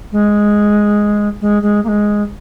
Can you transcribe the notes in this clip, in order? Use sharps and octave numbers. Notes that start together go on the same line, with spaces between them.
G#3
G#3
G#3
A#3
G#3